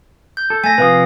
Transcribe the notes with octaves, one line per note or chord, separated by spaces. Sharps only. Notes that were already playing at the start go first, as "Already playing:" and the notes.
G6
A4
A3 G#5 A#6
C3 F3 B4 F5 D#6